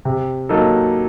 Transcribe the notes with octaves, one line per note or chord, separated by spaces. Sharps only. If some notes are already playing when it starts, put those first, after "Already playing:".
C3
F#3 A#3 D#4 A4